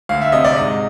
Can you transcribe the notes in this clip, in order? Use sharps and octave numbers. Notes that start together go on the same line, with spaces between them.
D2 F5
E5
C3 D#5
D5
G#2 D#5